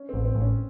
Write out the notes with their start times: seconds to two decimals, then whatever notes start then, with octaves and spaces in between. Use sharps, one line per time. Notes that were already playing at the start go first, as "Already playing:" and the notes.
Already playing: C#4
0.09 A1 C4
0.25 C4
0.35 A1
0.41 C#4